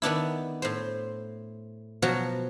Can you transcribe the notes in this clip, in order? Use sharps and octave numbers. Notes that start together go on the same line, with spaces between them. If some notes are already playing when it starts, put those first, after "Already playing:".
D#3 B3 D4 E4
A2 C5
B2 F3 F#3 F#4